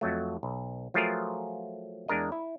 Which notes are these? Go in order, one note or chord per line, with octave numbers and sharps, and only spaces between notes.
F2 F#3 A3
B1
F3 F#3 A3 F4 G#4 A#4
E2 G#3 D4 A#4 D#5
E4